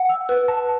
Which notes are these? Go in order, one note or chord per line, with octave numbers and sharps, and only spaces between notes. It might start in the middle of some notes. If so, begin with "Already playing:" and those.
Already playing: F#5
E6
B4
A5